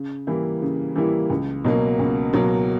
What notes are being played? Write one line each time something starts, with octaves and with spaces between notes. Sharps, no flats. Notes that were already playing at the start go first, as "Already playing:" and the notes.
Already playing: C#3
E3 G3 A#3 E4
C#3
E3 G3 A#3 E4
C#2
B2 F#3 A#3
C#2
B2 F#3 A#3